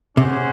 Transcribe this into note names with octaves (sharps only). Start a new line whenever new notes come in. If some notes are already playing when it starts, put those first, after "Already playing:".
C3 C#4 G#4 C5 F#5